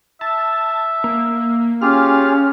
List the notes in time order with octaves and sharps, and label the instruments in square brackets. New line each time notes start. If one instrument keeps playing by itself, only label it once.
[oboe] E5 [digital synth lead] A5
[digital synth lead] A#3
[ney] C#4 [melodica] F4 G4 G#4 [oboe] F5 [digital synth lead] F6